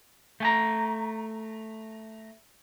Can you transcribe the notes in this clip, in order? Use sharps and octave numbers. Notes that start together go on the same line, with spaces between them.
A3 G#5 A#5